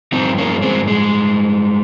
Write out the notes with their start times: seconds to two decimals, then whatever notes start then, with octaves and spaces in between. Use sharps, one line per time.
0.12 G2 F3 C4 D#4
0.38 A#3 C#4
0.62 G#3 C4
0.88 G#3